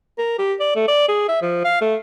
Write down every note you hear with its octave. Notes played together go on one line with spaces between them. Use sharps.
A#4
G4
D5
A3
D5
G#4
E5
F3
F5
A3